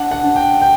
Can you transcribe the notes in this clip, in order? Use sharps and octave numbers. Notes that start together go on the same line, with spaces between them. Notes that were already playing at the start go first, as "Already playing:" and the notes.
Already playing: D4 F#5
F#5
D4
G5
G5